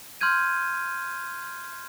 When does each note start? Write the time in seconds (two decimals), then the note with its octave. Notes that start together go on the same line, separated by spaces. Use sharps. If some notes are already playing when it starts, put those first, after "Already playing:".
0.21 C6 F6 G6 G#6 D#7